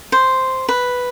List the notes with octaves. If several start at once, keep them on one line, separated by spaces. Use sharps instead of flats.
C5
B4